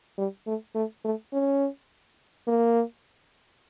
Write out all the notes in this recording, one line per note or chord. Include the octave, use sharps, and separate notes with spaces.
G3
A3
A3
A3
C#4
A#3